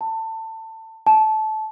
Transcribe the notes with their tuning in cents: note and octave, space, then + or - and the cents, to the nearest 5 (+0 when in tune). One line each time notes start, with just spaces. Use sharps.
A5 +25
A5 -20